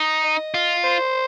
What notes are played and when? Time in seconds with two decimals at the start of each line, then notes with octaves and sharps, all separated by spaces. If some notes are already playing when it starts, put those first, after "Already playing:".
Already playing: D#4
0.23 D#5
0.54 F4
0.84 C5